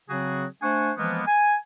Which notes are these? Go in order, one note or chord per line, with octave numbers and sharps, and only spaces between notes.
C#3 F#3 C4 F#4 G#4
A3 D4 C5 F#5 G#5 C#6
E3 F3 G#3 A#3 B3
G#5